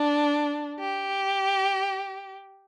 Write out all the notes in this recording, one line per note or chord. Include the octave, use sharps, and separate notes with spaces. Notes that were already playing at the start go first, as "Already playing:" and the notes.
Already playing: D4
G4